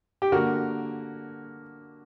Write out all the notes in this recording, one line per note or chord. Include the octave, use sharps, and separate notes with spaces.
G4
D3 A#3 F#4 A#4